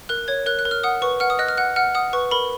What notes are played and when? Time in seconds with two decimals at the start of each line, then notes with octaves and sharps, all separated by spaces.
0.09 A#4 F#6
0.28 C#5 G#6
0.46 A#4 F#6
0.59 F#6
0.65 A#4
0.71 F6
0.84 F#5 D#6
1.02 B4 C#6
1.20 F#5 F6
1.30 D#6
1.39 D#5 F#6
1.48 F6
1.57 F#5 F#6
1.76 F#5 F6
1.95 F#5 D#6
2.13 B4 C#6
2.31 A#4 B5